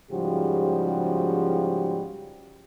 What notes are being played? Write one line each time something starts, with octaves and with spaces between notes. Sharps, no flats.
G#2 C#3 F3 G3 F#4 G4